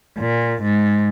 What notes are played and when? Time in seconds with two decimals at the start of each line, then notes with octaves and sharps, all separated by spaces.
0.19 A#2
0.63 G#2